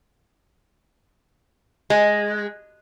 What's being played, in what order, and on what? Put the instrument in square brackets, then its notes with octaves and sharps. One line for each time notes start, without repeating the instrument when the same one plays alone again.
[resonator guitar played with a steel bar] G#3